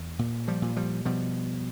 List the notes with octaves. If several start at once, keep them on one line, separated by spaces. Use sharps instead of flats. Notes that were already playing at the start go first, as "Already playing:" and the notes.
Already playing: E2
A#2
F3 G3
A#2
F3 G3
B2 F3 G3